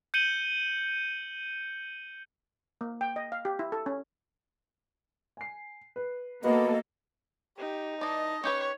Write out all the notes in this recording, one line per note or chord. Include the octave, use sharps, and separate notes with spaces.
G6 C#7 D#7 F#7 G7
A#3
G5
D#5
F5
G4
E4
A4
C#4
G#5 C7
B4
A#3 B3 F#4 A4 D#5
D#4 G4
E3 D5 D#5 A5
C#4 G4 B4 C#5 C#6